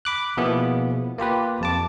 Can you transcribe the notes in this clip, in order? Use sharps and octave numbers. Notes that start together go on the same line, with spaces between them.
B5 D6 F#6
B2 F3 A#3 B3 E4 G#4
A#3 F4 G4 B4
F2 A5 D6